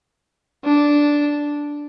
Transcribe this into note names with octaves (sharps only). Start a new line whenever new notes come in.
D4